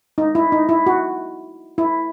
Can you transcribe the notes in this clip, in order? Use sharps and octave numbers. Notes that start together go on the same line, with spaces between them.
D#4
E4
D#4
E4
F#4
E4